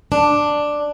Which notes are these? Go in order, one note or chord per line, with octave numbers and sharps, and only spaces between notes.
D4